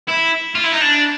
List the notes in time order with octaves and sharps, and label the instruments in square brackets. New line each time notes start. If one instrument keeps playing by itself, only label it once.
[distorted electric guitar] E4
F4
E4
D#4
D4